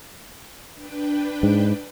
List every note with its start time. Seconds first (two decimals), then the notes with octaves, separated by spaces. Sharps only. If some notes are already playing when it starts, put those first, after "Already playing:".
0.75 D4 B4 G5
1.43 G#2